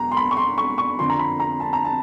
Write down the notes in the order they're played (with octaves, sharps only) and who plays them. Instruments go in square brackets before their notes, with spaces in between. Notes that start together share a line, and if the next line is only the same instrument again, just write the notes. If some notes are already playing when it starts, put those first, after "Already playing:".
Already playing: [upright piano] E2 B2 F#3 A#5
C6
B5
C#6
C6
C#6
C#6
F2 D3 F3 C6
A#5
B5
A#5
A5
A#5
A5